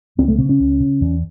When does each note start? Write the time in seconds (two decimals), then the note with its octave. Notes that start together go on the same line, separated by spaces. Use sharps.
0.18 C#2 C4
0.28 A3
0.38 C#3 C4
0.49 C#4
0.60 C#2
0.80 C#3
1.01 E2